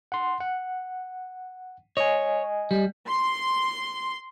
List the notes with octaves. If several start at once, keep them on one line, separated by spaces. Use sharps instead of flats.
F#5 C6
F#5
C#5 D#5 G#5
G3
C6